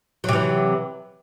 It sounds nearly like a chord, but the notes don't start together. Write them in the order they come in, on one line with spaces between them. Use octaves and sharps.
F#3 C3 E3